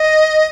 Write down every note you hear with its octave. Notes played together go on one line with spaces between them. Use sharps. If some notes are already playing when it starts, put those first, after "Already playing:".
Already playing: D#5